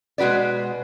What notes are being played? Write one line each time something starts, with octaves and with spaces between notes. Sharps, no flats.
B2 G#3 F#4 B4 D5